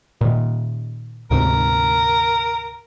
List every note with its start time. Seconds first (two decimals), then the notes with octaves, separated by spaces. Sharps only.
0.21 A#2 D#3
1.31 D2 G#2 C3 A#4